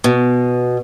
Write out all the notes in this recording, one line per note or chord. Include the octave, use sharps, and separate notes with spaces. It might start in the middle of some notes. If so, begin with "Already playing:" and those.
B2